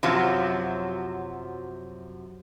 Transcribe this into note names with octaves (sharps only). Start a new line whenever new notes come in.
F#2 C3 F3 F#3